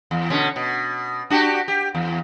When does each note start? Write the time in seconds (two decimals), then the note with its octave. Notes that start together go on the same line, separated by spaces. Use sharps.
0.11 E2
0.30 B2 D3 C#4
0.56 B2
1.30 D4 F#4 G4
1.68 G4
1.95 E2